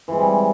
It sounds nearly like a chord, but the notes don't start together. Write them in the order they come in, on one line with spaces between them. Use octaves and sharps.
E3 G#3 C4 G3